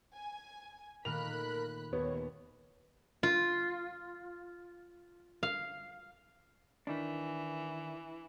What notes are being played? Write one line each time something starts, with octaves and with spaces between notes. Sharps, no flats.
G#5
A#2 D#3 A3 A#4 B5 F#6 F7
D#2 B3 C#5
F4
F5
D#3 E3 D4